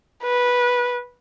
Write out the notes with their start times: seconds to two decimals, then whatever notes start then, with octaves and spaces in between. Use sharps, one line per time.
0.23 B4